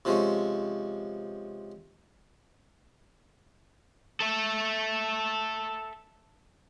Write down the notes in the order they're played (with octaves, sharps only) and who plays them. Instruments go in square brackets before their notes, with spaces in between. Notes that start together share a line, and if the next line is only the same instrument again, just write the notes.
[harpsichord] C3 F3 G#3 C#4
[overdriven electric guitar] A4 E5